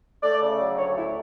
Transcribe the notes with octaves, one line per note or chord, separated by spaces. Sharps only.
A3 D5
C#3
F#3
D2 C#5
A3 E4